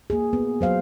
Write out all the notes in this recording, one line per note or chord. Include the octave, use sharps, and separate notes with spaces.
A#3 G#4
B3
F#3 C5 F5